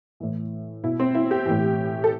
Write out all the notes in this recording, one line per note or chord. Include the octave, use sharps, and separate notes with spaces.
A2 E3
B2 E4
C4
E4
G4
A2 E3
A4